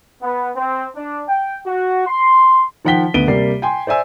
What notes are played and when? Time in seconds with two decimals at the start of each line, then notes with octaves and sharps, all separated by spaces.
0.22 B3
0.56 C4
0.95 D4
1.28 G5
1.66 F#4
2.07 C6
2.85 D#3 F3 F#5 G5 B6 G7
3.14 D2 B3 D7 D#7 G7
3.27 C3 G3 A#3 D5 C7
3.62 G5 G#5 C6
3.87 C5 D5 E5 G#5 E6